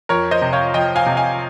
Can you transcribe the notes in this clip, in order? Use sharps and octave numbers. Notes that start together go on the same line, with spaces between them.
F2 A#4 C#5
C5 D#5
C3
C#5 F5
F3 D#5 G5
F5 G#5
C3
F5 G#5